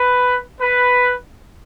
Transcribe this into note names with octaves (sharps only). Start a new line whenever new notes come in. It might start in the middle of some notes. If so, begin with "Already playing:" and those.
Already playing: B4
B4